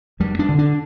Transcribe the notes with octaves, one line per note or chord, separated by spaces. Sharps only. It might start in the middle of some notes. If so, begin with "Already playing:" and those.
F2 G3
D4
D3
D4